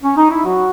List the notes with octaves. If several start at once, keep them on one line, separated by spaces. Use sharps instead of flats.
C#4
D#4
E4
F#3 F#4